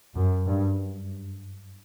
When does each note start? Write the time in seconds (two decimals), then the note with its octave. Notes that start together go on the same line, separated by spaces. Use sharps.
0.15 F#2
0.46 G2